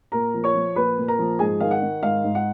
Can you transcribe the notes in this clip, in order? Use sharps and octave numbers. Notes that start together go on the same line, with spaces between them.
A#2 A#4 A#5
F3
C#5 C#6
F3
A#2 B4 B5
A#2
A#4 A#5
F3
G#2 G#4 G#5
D#3 F5
F#5
D#3
G#2 F5
G#2
F#5